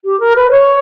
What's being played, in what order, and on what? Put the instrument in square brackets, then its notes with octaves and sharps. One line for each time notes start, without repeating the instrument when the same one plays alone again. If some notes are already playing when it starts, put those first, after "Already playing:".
[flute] G4
A#4
B4
C#5